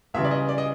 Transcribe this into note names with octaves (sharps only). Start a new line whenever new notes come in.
C#2 C#3 E3 G3 E5
D5
D#5
D5
D#5